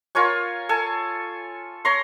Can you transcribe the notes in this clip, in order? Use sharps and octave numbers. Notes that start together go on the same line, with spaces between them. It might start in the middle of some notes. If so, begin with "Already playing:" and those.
F4 A#4 C#5 G#5
A4 G#5
C#5 A#5 C6